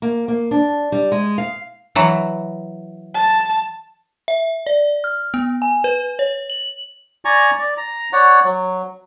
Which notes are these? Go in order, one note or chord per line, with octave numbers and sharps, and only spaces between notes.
A#3
A#3
D4
G3
G#3
F5
E3 F#3
A5
E5
D5
F6
B3
G#5
B4
C#5
F#7
D5 G#5 A#5 C#6
D5
A#5
C#5 D5 F#5
F#3